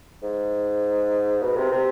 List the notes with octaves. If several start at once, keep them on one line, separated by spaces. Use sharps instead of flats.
G#2
B2
C3
C3